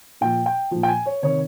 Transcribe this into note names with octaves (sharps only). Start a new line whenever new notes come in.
A#2 F3 G5
G5
A#2 F3
G5
G#5
C#5
C3 D#3 C#5